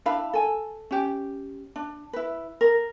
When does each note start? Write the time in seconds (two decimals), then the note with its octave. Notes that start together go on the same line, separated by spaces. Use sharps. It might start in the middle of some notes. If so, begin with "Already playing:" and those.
0.06 D4 E4 F5 B5
0.33 A4 G#5
0.91 C#4 G4
1.76 D4
2.13 E4 B4
2.61 A#4